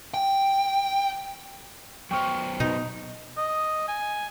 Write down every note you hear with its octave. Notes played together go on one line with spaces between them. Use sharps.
G5
F#3 B3 C5 G5 C#6 F6
B2 D#4
D#5
G#5